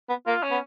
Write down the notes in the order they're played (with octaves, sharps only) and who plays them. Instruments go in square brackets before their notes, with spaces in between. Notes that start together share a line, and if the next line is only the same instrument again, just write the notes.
[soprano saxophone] B3
[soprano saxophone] A#3 [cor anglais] F4
[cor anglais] C#4
[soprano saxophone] B3